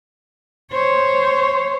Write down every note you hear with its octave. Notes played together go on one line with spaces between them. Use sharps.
C5 C#5